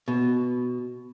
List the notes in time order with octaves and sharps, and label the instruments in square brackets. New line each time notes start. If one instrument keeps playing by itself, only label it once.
[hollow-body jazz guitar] B2